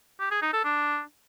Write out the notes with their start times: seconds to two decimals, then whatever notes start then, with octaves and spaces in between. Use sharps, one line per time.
0.20 G4
0.31 G#4
0.42 D#4
0.53 A4
0.64 D4